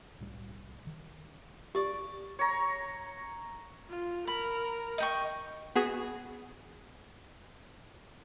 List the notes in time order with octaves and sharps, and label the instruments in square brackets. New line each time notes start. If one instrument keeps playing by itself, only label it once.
[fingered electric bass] C2 A2 G3
D#3
[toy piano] G4 [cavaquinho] D5 C#6
[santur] C#5 A#5
[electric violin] F4
[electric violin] A#4 [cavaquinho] B5
[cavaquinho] D#5 G5 C#6
[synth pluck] B3 F#4 G#4